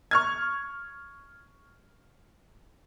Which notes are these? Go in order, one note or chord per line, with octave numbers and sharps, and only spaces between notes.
C#6 F6 G#6